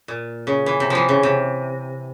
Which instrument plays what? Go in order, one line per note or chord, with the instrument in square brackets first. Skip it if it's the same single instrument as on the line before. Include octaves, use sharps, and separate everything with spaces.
[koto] A#2
C#3
E3
C3
E3 F3
C#3
C3